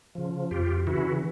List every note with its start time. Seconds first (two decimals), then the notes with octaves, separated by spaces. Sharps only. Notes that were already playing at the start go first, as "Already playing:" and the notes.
0.15 C#3 F3
0.51 F2 F4 G4
0.87 C#3 E3 E4 F#4